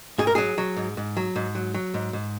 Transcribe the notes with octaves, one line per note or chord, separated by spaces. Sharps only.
G#2 G#4
A#4
F#3 G#4
F#3
G#2
G#2
F#3
G#2
F#3
F#3
G#2
G#2